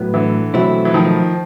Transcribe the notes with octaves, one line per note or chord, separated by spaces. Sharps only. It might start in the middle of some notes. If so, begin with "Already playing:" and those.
Already playing: A2 F#3 B3
D3 E3
B2 F#3 A3 C4 E4
E3
D#3 F3